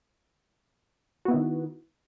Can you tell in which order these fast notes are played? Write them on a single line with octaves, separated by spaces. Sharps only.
F#4 B3 E4 D#3 D#4